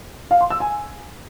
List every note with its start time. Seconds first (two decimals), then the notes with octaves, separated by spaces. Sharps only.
0.31 F5
0.41 C6
0.50 E6
0.60 G#5